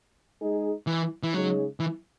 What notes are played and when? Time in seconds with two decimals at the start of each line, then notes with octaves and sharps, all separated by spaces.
0.40 G#3 D#4 G#4
0.87 E3
1.23 E3
1.33 C#3 F#3 G#3 D#4 G#4 C#5
1.80 E3